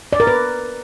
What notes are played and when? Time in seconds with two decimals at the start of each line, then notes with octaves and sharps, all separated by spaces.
0.13 D5
0.20 A#4
0.27 B4